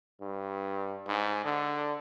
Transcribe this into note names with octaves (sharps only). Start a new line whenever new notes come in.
G2
G#2
D3